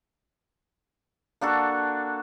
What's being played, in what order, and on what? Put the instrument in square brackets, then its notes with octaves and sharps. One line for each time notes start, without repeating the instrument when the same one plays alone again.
[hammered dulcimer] A#3 D4 F#4 A4